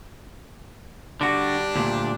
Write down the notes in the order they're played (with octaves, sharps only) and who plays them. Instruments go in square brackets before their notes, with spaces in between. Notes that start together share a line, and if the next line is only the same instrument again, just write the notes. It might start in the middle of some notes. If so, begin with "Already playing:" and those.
[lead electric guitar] D3 F#4 [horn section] G3 D4
[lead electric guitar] D2 A#2